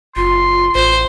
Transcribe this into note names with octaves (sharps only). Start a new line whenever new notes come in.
F#1 F4 C6
A1 C5